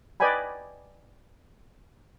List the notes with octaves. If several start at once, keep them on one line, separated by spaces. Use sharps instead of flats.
B4 D5 D#5 G5 G#5 B5